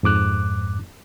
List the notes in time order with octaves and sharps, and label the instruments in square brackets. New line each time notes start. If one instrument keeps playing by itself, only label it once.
[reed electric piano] F2 G#2 D6 F#6